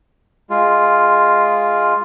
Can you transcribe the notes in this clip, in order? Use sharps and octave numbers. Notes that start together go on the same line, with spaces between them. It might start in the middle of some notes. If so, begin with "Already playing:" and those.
G#3 F4